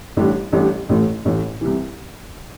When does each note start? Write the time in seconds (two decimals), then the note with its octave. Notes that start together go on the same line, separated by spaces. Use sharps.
0.17 A1 A2 G3 D4 G4
0.52 A1 A2 G3 D4 G4
0.89 A1 A2 E3 A3
1.25 A1 A2 E3 A3
1.61 C2 C3 E3